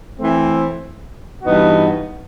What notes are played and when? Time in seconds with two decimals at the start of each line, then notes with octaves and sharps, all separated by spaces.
0.19 E3 A3 C4
1.43 G2 E3 B3 D#4 F#4